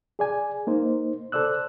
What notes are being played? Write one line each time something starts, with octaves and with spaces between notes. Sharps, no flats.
G#4 D5 G#5
A#3 D#4 C5
A4 C5 D5 E6 F#6